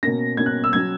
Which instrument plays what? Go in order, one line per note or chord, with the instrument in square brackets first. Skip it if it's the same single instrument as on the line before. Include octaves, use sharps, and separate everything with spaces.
[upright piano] B2 A#3 C#4 A#6
B2 A#3 C#4 G#6
F#6
E6
F#3 C#4 G#6